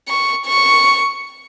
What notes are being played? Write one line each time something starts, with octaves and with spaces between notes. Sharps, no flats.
C#6
C#6